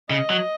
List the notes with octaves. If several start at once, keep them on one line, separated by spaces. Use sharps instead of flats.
C#3 D#5
F#3